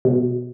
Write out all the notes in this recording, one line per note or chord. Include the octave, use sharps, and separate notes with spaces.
B2